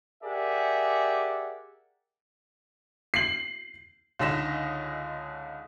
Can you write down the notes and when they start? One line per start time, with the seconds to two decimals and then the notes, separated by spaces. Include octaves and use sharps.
0.23 G4 G#4 A#4 D5 E5 F#5
3.14 C7 F#7
4.19 C#2 D3 D#4 D#5 B6 E7